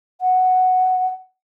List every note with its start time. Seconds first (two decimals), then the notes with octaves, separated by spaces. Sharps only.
0.21 F#5